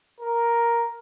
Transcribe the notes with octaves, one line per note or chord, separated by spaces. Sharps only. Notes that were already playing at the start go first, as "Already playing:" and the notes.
A#4